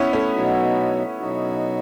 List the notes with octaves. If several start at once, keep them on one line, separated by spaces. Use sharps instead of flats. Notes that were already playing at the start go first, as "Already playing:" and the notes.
Already playing: B3 C#4 E4
A3 C#4
B2 F#3 B3 D#4 F#4
B2 F#3 B3 D#4 F#4